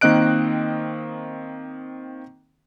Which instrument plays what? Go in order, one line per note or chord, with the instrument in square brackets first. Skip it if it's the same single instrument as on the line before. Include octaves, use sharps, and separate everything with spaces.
[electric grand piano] D#3 A#3 C4 D#5 F#6 D7